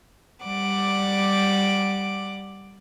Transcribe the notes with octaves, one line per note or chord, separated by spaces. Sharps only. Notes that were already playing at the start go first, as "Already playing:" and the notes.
G3 D5 F#5 D6